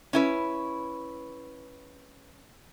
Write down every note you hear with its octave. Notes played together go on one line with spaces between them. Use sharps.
C#4 E4 B4